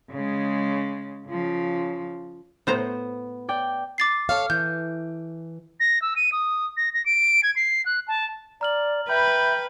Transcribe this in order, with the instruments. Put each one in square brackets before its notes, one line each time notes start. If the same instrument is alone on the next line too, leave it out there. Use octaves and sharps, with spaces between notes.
[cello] C#3 G#3
C#3 F3
[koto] A2 C5 A#5 [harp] B3
[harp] D5 G5
[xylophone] D6 A6 C7
[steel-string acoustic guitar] A4 C#5 F5 [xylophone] F6
[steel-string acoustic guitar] E3 [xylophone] G6
[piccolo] A#6
E6
D#7
D#6
A#6
A#6
D7
G#6
C7
F#6
A5
[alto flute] D5 [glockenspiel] A#5 F6 F#7
[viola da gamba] B4 [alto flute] E5 [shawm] G5 [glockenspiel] B5